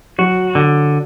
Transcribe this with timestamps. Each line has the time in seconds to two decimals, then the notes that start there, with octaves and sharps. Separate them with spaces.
0.18 F#3 F#4
0.55 D3